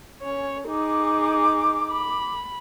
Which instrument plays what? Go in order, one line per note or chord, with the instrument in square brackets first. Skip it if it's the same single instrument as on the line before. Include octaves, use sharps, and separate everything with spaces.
[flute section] C#4 [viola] C#5
[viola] D#4 G#4 [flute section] D6
[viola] B5